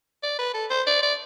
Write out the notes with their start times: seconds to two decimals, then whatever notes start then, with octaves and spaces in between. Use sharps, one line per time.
0.23 D5
0.39 B4
0.54 A4
0.70 C5
0.87 D5
1.02 D5